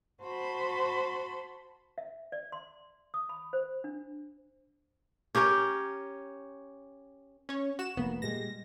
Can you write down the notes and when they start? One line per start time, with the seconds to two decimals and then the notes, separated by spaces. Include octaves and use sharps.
0.23 F#4 C5 A5 B5 C6
1.98 E5
2.32 D5
2.52 C6
3.14 D#6
3.29 B5
3.53 C5
3.84 D4
5.35 C#4 G4 A#4 C#5
7.49 C#4 C#5
7.79 F#4 E7
7.97 F1 A#3 B3
8.22 A#2 G3 G#3 A#6